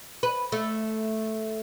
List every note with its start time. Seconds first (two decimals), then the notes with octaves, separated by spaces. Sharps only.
0.23 B4
0.52 A3